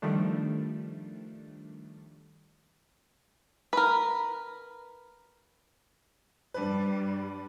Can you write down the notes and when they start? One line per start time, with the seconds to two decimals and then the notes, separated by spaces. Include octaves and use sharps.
0.02 D#3 F3 G3 A3 D4
3.73 A#4 B4
6.54 G2 G3 D4 B4